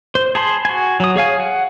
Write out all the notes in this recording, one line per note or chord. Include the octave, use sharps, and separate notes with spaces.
C5
G#4 A5 B5 C6
F#4 G#5
F#3 D#6
G#4 C#5 F5 G#5
F#5